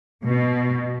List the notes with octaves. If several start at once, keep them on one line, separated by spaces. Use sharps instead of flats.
B2